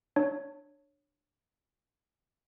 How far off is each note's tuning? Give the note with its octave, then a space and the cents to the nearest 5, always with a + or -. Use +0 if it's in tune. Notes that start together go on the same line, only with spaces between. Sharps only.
D4 +15 C#5 +0